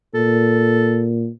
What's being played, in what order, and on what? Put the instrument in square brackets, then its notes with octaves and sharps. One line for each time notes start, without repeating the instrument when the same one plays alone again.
[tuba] A#2 [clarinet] A4